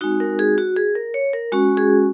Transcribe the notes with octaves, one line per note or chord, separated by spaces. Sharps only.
G#3 C4 D#4 F#4
A#4
G#4
F#4
G#4
A#4
C#5
A#4
G#3 C#4 F#4
G#4